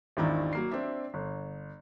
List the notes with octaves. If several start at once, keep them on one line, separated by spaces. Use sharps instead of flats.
G#1 E2 D#3 D4 E4 A#5
F#3 A#3 C7
C4 D4 E5
G1